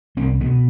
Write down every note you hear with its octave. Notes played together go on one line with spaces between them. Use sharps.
C2 C4
B2 B3